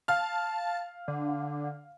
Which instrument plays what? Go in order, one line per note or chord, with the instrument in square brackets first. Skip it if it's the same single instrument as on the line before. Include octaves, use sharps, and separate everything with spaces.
[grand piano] F5 F6 [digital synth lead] A5
[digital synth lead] D3